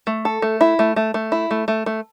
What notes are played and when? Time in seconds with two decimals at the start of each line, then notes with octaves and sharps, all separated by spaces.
0.07 A3
0.25 A4
0.42 A3
0.61 E4
0.79 A3
0.96 A3
1.14 A3
1.32 E4
1.51 A3
1.68 A3
1.86 A3